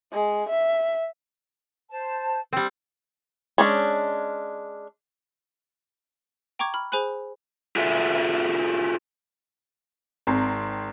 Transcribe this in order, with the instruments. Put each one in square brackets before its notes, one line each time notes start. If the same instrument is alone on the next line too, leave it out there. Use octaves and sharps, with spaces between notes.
[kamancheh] G#3
E5
[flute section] C5 A5
[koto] G3 C4
[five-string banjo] G#3 C#4 D4
[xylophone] G5 A#5 C#6 D6 G#6
B5 F6
G#4 C5 G#5 B5 F#6
[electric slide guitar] F4 F#4 G#4 A4 E5
[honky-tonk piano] G#1 C4 A#5